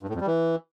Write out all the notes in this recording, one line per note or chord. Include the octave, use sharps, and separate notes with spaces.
G2
A2
F2
G3
E3